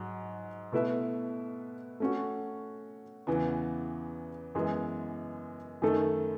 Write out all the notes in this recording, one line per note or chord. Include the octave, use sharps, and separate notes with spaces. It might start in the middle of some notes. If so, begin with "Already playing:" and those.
Already playing: G#2 F#3
B2 A3 E4 B4 E5
A3 C#4 F#4
E2 C#3 E3 B3
F#2 E3 G#3 B3
F#2 D#3 A3 D#4 A4